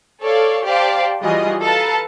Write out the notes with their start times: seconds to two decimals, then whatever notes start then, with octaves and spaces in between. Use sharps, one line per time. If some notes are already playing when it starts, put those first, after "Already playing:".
0.22 A4 C#5 D5 F5
0.65 G4 C5 D5 F5 G5 A5
1.22 E3 G3 F4 F#4 G#4 D#5
1.62 A4 B4 F5 A5 A#5